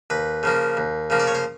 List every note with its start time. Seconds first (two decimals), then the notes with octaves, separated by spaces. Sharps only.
0.10 D#2 B4
0.43 C#3 F3 A#3
0.77 D#2
1.10 C#3 F3 A#3
1.20 D5
1.27 C#5
1.35 C5